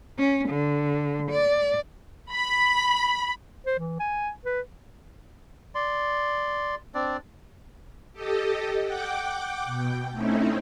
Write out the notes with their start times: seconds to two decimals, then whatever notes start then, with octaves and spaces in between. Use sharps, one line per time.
0.19 C#4
0.49 D3
1.31 D5
2.33 B5
3.66 C5
3.79 E3
3.99 G#5
4.45 B4
5.75 D5 C6
6.95 C4 D4 D5
8.12 G4 A4 D#5
8.83 F#5 G5 D6
9.65 B2 G5
10.11 A3 C4 C#4 D#4 E4